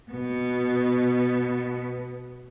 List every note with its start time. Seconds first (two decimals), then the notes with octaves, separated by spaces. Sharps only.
0.11 B2 B3